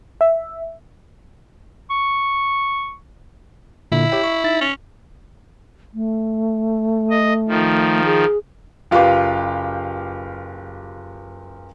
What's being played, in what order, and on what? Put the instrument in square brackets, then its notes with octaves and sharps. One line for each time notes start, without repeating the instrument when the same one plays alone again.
[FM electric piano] E5
[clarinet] C#6
[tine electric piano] A#2 D3 [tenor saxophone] E4
[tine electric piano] G4 C#5 G5
C#6
D#4 E5 A6
[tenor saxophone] C#4
[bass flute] A3
[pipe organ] D#5
D#3 F3
[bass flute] G#4
[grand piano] F#1 F4 G4 B4 F5 D6